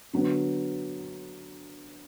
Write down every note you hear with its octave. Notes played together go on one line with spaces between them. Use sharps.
D3 F#3 B3